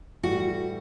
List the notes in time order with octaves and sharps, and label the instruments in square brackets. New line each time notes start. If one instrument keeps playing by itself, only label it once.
[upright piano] A2 E3 G3 [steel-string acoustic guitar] F#4